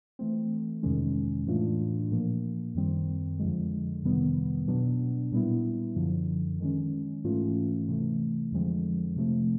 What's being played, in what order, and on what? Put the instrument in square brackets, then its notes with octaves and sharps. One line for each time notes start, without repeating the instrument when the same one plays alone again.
[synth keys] E3 A3 C4
F2 C3 D#3 G#3 C#4
A2 E3 A3 D4 F4
A#2 F3 A#3
F#2 D#3 G3 C4
F2 D3 F3 G#3
F2 C3 D#3 G3 B3
B2 F#3 B3 D4
A#2 G3 B3 E4
F#2 D3 F3
D#3 G#3 C#4
G#2 E3 A3 C#4 F4
C3 E3 A3
F2 D3 F3 G#3 C4
C3 F3 A3 C4